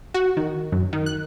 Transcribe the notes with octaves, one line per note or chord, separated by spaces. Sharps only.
F#4
D#3
F#2
D#3
F#6